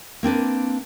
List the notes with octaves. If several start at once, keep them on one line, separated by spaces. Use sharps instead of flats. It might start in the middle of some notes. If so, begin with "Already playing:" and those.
A#3 C4 D4 B4